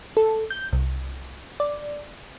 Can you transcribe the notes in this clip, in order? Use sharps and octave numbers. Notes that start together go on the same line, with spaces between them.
A4
G6
C2
D5